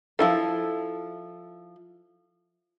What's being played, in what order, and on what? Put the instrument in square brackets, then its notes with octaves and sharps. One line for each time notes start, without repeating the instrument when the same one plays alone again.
[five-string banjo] F3 E4 A4